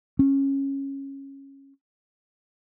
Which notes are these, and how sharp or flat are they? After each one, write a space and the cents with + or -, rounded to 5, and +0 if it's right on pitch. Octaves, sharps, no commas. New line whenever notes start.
C#4 -15